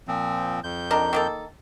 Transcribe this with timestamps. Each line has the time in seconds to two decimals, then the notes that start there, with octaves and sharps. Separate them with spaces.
0.08 A#2 F3 C4
0.64 F2 G6
0.91 D#3 D4 A#4
1.13 D#3 A#3 A4